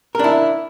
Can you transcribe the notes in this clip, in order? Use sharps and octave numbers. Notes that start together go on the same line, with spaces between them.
D4 E4 A#4